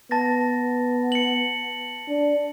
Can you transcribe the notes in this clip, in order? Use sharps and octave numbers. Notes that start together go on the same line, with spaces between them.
B3 A5 A6 A#6
C#7 F#7
D4